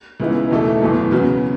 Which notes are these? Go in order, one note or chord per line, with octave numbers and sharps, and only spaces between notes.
C#2 C#3 E3 B3 D#4
E2 B2 A3 D#4 A4
F#1 E2 B2 F#3
E2 C#3 F#3 B3 F#4